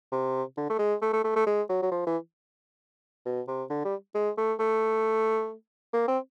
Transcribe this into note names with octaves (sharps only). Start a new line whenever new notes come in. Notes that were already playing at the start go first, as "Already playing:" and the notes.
C3
D3
A3
G#3
A3
A3
A3
A3
G#3
F#3
F#3
F3
E3
B2
C3
D3
G3
G#3
A3
A3
A#3
C4